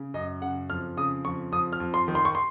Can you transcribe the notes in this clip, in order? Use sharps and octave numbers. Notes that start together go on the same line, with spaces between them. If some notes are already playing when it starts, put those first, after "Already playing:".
Already playing: C#3
F#2 D#5
C#3 F#5
F2 F6
C#3 D#6
F2 C#6
F2 D#6
F6
F2
C6
D#3
C6
C#6
C6